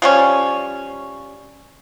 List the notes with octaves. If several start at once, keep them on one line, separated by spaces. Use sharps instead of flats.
F3 G3 C#4